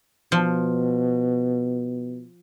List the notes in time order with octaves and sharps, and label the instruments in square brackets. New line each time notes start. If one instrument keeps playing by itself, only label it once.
[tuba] B2 [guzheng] F3